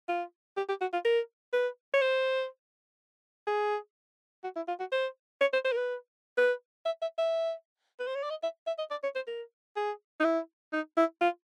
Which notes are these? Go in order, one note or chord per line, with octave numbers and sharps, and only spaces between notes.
F4
G4
G4
F#4
F4
A#4
B4
C#5
C5
G#4
F#4
E4
F4
F#4
C5
C#5
C5
C5
A#4
B4
B4
E5
E5
E5
B4
C5
C#5
D5
D#5
E5
E5
D#5
D5
C#5
C5
A#4
G#4
D#4
E4
D#4
E4
F4